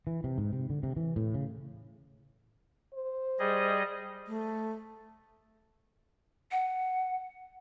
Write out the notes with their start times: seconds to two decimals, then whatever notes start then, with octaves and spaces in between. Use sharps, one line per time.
0.07 E3
0.24 C3
0.38 G#2
0.53 C3
0.70 D3
0.83 C3
0.96 E3
1.16 A2
1.34 C#3
2.94 C5
3.39 G3 G#4 D#5
4.27 A3
6.51 F#5